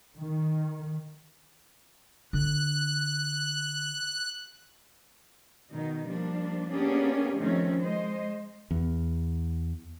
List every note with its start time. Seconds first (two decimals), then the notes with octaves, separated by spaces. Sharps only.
0.18 D#3
2.33 D3 F#6
5.73 B2 D#3 D#4
6.06 F3 G3 A#3 D4
6.71 A#3 B3 C#4 D4 G4 G#4
7.38 D#3 F3 A3 C4 C#4
7.82 G#3 C5 D#5
8.71 E2